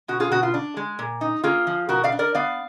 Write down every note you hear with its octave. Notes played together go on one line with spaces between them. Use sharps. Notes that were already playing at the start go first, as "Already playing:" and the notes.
B2 F#4
F4 G#4
B2 F#4
F4
D4
G#3
A#2
D#4
A#3 F4 G#4
F3
B2 F#4 A#4
D5 F5
D4
A#4 D5
B3 D5 F5